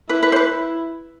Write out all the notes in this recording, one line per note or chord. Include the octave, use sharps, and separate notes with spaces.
E4 B4
B4
C5
B4
E4